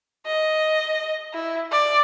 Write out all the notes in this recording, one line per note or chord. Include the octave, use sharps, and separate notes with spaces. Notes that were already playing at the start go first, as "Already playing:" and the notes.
D#5
E4
D5